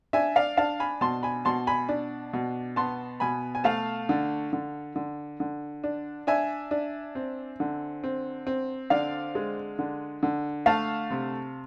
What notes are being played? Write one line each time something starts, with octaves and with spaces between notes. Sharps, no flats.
D4 E5 G#5
D5 F5
D4 F5 A5
G#5 B5
B2 A5 C6
G#5 B5
B2 A5 C6
G#5 B5
D4
B2
B3 A5 C6
B2 G#5 B5
G#5
A3 F5 A5
D3
D3
D3
D3
D4
D4 E5 G#5
D4
C4
D3
C4
C4
D3 D5 F5
G#3
D3
D3
A3 F5 A5
C3